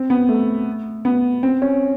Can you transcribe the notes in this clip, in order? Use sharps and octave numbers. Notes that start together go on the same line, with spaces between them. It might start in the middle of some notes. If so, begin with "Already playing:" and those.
Already playing: C4
B3
A3
B3
C4
C#4